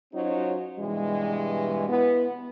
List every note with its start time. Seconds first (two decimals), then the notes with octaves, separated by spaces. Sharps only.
0.13 F#3 C#4 D#4 F4 F#4 C5
0.79 G2 B2 E3 G3 G#3
1.88 B3 E4